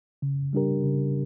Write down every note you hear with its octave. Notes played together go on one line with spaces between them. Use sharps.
C#3
G3 D4 G4 A#4
C#3